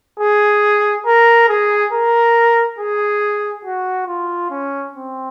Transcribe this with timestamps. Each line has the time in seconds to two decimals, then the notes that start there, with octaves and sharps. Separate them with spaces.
0.20 G#4
1.06 A#4
1.49 G#4
1.93 A#4
2.79 G#4
3.65 F#4
4.07 F4
4.50 C#4
4.95 C4